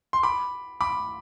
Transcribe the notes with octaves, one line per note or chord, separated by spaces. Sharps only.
C6
B5 D6
B5 D6